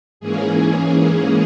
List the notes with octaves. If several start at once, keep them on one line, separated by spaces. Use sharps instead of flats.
G#2 E3 A#3 C#4 G#4